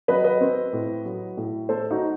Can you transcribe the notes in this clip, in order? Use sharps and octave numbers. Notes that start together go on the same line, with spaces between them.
F#3 B4 D#5
B4 D#5
C4
A2
F#3
A2
A3 A4 C5
D#4 F#4